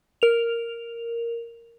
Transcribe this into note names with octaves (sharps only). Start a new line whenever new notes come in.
A#4 F7